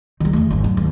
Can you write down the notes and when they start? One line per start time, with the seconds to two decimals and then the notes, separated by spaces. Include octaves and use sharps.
0.20 D#3 G3
0.33 E2 A3
0.50 G#1 D#3
0.64 F#2
0.77 D#2